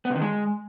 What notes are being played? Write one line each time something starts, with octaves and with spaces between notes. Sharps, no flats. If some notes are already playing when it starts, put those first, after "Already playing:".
B3
C3
D#3
G#3